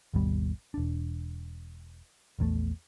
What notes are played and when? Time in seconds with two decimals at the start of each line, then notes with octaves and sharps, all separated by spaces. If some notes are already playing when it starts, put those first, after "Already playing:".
0.14 G#1 D#2 B2 G3
0.74 E1 D4
2.39 A#1 E2 D3 A3